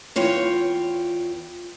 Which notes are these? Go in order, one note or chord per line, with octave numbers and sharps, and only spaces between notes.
E2 F4 C#5 G5